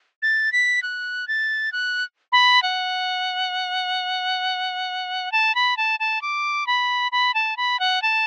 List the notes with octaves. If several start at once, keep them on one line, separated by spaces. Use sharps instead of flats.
A6
B6
F#6
A6
F#6
B5
F#5
A5
B5
A5
A5
D6
B5
B5
A5
B5
F#5
A5